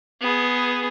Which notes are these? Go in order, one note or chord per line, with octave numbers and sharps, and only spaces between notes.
B3 G#4